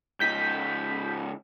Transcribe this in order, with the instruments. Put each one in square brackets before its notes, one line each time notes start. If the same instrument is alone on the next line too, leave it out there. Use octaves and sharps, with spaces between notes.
[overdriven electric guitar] C#2 D#4 [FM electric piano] G6 B6